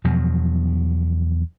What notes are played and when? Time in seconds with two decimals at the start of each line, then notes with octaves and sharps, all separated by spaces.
0.04 E2 B2 F3 F#3